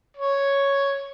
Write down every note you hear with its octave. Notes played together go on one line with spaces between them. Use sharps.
C#5